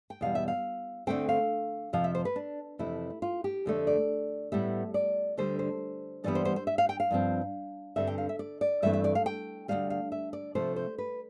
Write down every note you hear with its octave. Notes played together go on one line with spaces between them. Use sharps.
G5
E2 B2 G3 F5
E5
F5
D2 D3 A3 C4 G5
F5
F2 C3 F3 F5
E5
C5
B4
D4
F2 C3 E3 A3 E4
F4
G4
F2 D3 A3
D5
A2 G3 B3 E5
D5
D2 D3 G3 C5
C5
G2 E3 G3 B3 D5
C5
C5
C5
E5
F5
G5
F5
G2 F3 C4
G2 D3 G3 C4 E5
G5
F5
E5
D5
D5
G2 E3 A3 C4 E5
E5
D5
F5
G5
D2 C3 G3 F5
F5
E5
D5
C3 F3 A3 C5
C5
B4